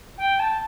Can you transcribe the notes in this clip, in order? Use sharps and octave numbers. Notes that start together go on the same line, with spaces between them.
G5
A5